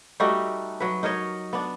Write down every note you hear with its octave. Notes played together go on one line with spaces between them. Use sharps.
G3 A3 D#4 F#4
F#3 B4
D#4 A#4 C#5 D#5
B3 D4